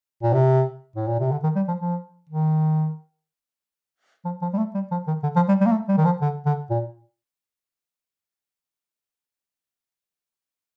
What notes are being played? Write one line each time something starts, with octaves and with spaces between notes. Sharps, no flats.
A#2
C3
A2
A#2
C3
D3
D#3
G3
F3
F3
D#3
F3
F3
G3
A3
G3
F3
D#3
D3
F3
G3
G3
A#3
A3
G3
D#3
F3
D3
D3
A#2